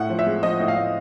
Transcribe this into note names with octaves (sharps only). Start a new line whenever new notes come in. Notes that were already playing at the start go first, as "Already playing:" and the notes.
Already playing: A2 F#5
F3
E5
G#3
F3 D#5
A2
F5
A2